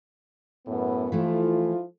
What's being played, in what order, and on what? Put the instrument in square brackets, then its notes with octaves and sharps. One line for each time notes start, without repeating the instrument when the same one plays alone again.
[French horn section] F#2 A2 B3
[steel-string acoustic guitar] E3 A3 G4 [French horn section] F3 E4 F4